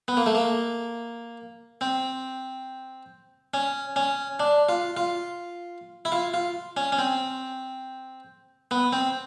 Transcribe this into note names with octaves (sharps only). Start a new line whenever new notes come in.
B3
A#3
A3
A#3
C4
C#4
C#4
D4
F4
F4
E4
F4
F4
C#4
C#4
C4
B3
C4